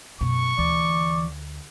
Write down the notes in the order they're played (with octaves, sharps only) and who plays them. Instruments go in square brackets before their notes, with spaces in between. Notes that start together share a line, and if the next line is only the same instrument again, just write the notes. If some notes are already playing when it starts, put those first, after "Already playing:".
[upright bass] F#2 B2 [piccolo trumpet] C#6
[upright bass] D2 [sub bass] E3 [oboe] D5